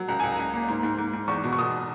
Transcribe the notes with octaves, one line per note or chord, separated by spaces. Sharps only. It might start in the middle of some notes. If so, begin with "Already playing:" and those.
Already playing: F#3
C#2 A#5
C#2 G#5
A#5
C#2
A#3
G#2
G#2
G#2
G#2
E2 C#6
B2
C#6
B2 D#6